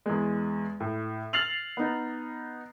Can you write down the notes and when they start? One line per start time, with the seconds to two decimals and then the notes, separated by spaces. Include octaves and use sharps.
0.06 E2 G#3
0.80 A2
1.33 F6 A6 C7 F7 F#7
1.77 B3 D#4